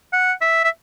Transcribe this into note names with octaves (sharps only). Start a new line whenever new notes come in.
F#5
E5
E5